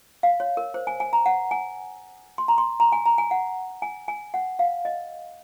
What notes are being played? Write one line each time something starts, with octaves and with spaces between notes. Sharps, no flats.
F5
C#5
A#4
C5
G#5
G#5
A#5
F#5
G#5
C6
A#5
C6
A#5
G#5
A#5
G#5
F#5
G#5
G#5
F#5
F5
D#5